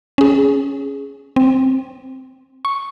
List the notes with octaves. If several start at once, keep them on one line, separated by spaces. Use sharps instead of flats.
C#4 G#4
C4
C#6